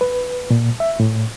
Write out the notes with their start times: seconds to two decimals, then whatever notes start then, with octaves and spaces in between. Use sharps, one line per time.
0.01 B4
0.50 A#2
0.80 E5
1.00 A2